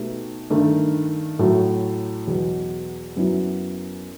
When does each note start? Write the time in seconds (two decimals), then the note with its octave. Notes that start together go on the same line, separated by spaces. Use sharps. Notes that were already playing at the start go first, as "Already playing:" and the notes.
Already playing: B2 A3 D#4 G4 B4
0.50 G2 D#3 A3
1.39 A2 F#3 A3
2.27 E2 B2 F#3
3.16 F#2 F#3 B3 E4